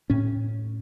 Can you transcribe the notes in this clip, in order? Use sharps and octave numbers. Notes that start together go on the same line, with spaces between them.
A2 C#4